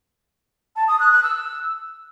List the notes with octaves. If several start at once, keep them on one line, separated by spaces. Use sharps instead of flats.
A5
D#6
F#6
F#6
E6